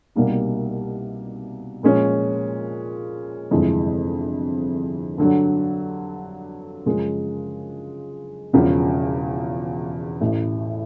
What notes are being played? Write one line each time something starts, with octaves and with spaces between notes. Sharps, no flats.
C2 B2 G3 A#3 D#4
A#2 F3 G#3 C#4
G1 F2 C3 E3 G#3
G2 D3 F#3
F#2 C#3 F3 G#3
E1 E2 C#3 F3
A1 A2 E3